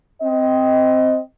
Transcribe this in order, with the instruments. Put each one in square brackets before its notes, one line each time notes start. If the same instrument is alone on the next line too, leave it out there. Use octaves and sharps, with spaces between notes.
[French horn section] C4 D#5